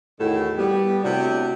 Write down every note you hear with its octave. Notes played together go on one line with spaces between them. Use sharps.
E2 A2 D#3 F#4 A4
G3 B3
A2 C3 D4 F#4